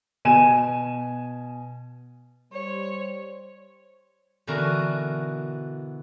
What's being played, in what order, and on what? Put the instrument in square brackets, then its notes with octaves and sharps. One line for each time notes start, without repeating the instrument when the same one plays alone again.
[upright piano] B2 G#5 D#7 E7
[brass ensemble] G3 C5 [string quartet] C#5
[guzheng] B2 D3 E3 F#4 A#4